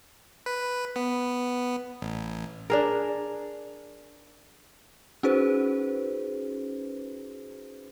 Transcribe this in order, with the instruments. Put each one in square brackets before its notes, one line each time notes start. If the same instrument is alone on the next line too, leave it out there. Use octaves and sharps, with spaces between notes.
[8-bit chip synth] B4
B3
A1
[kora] D4 G#4 A#4
[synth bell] C#4 D#4 F#4 G#4 B4 C5